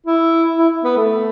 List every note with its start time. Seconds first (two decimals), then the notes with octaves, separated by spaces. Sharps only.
0.06 E4
0.58 E4
0.84 B3
0.97 A3